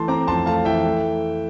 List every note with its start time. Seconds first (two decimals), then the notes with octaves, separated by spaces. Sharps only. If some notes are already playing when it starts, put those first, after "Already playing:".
Already playing: E3 A3 A5 C6
0.08 C4 A#5 D6
0.27 F2 A5 C6
0.46 A3 F5 A5
0.65 E3 E5 G5
0.84 A3